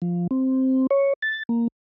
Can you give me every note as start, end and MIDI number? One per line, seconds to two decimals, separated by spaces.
0.02 0.27 53
0.31 0.87 60
0.91 1.13 73
1.22 1.43 93
1.49 1.68 58